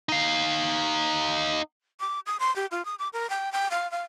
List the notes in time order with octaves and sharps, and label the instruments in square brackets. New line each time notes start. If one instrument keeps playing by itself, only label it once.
[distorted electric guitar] D#4 F5
[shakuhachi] D6
D#6
C6
G4
F4
D#6
D6
A#4
G5
G5
F5
F5